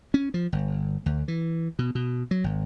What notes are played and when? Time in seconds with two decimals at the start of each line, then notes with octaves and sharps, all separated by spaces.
0.14 C#4
0.34 F3
0.52 G1
1.06 D2
1.28 E3
1.79 B2
1.95 B2
2.31 F#3
2.44 G#1